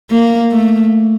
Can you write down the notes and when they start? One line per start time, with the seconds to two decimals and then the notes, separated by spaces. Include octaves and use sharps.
0.11 A#3
0.52 A3